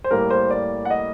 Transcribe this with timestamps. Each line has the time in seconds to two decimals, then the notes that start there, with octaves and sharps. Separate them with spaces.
0.04 C5
0.11 A2 G3 A#3 A#4
0.30 C5
0.51 D5
0.85 F#5
0.90 D#5